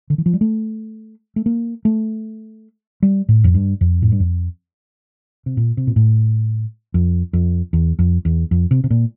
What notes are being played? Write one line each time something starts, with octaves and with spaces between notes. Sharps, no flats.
D3
E3
F3
G3
A3
A3
A#3
A3
G3
A2
F2
G2
F2
A2
G2
F2
C3
A#2
C3
A#2
A2
F2
F2
E2
F2
E2
F2
C3
C3
A#2